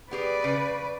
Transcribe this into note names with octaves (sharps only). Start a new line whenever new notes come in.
B3 G4 G#4 B4 D5
C#3